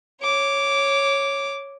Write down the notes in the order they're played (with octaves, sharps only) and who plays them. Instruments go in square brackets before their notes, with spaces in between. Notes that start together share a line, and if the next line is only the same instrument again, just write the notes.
[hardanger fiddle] C#5 D6